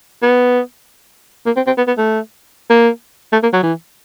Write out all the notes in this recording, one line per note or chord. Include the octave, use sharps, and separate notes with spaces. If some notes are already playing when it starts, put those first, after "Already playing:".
B3
A#3
C4
C4
B3
B3
A3
A#3
A3
A#3
F#3
E3